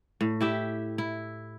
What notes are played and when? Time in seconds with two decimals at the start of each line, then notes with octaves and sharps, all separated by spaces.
0.21 A2
0.41 E4 G4 E5
0.98 E4